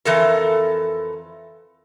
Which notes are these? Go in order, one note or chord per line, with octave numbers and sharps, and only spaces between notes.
F2 E3 A4 A#4